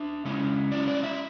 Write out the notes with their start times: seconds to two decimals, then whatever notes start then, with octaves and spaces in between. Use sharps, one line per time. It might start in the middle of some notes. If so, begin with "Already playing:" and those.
Already playing: D4 E5
0.25 C#3 G#3 C#4 E4
0.71 F#3 C#4 E4 D5
0.88 D5
1.03 E5